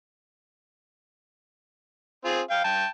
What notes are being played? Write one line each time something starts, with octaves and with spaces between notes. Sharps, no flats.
C4 F4 G#4
F5 G5
G5 A5